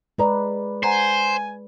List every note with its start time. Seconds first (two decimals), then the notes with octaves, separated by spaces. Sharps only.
0.18 G#3 B4 D5 D#5 A#5
0.83 C5 F#5 G#5 A#5